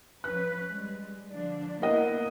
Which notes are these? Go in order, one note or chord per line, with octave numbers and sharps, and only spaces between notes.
F3 C#4 B4 F#6
G3 G#3
D3 F3 D4
A#3 B3 E4 A#4 D#5 F#5